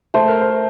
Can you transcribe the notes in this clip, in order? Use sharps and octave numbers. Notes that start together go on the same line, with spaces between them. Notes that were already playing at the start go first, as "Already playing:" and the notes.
A3 C5
A#4
C5